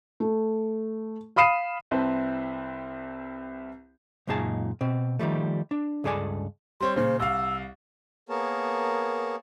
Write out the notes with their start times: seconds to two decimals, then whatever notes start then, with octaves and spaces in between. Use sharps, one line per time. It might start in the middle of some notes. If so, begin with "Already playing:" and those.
0.20 A3
1.36 F5 B5 D#6 C7 D#7 E7
1.91 C2 C4 E4 B4 C5 A5
4.27 C#2 F#2 A#2 D#4 G#4 A5
4.81 B2 C4
5.19 D#3 F3 G3 A3
5.71 D4
6.04 C#2 G2 G#4 A4 D5 G#5
6.81 G3 C4 C#5 C6
6.96 A#2 C#3 C5
7.20 C2 F5 E6
8.29 A#3 B3 G#4 A#4 C#5 A5